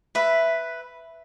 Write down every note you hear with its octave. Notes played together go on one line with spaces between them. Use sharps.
B4 E5